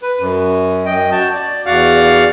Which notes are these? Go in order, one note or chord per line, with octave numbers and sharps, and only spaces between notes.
B4
F#2
F#2 D#5 G5
F#4 A5 G6
D5
E2 F#4 D5 F5 F#5 F6